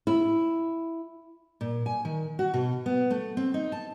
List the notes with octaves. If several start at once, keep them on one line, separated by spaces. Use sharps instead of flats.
E4
A#2
G#5
D#3
F#4
B2
B3
A3
C4
D#4
A5